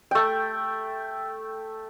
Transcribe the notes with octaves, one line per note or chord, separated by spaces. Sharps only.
A3 G5